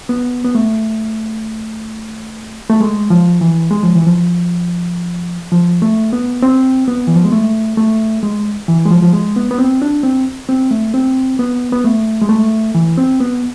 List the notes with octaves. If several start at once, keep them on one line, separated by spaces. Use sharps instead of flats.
B3
B3
A3
A3
G#3
F3
E3
G#3
F3
E3
F3
F3
A3
B3
C4
B3
E3
F3
G#3
A3
A3
G#3
E3
G#3
F3
F3
G#3
B3
B3
C4
D4
C4
C4
A3
C4
B3
B3
A3
G#3
A3
E3
C4
B3